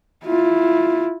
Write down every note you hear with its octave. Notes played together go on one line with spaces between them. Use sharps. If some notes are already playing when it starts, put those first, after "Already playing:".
E4 F4